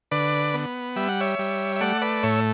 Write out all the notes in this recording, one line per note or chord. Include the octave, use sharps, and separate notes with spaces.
D3 B4 D5
B3
G3 E5
F#5
C#5 E5
G3
E5
A3 D5 F#5
B4 D5
A2 C#5 E5